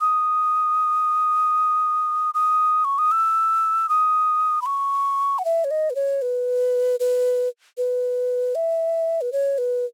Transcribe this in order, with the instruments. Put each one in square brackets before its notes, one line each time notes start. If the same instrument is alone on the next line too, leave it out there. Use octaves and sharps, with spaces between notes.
[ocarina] D#6
D#6
C#6
D#6
E6
D#6
B5
C#6
F#5
E5
C#5
D#5
B4
C#5
B4
B4
B4
E5
B4
C#5
B4